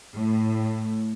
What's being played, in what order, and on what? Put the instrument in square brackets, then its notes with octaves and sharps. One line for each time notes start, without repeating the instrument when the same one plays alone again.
[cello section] A2